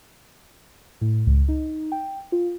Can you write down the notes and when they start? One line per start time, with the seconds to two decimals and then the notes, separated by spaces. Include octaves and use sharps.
1.01 A2
1.27 C#2
1.48 D#4
1.92 G5
2.32 F4